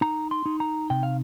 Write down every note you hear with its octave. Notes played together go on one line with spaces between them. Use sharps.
D#4 A#5
C6
D#4
A#5
C3 G5
F5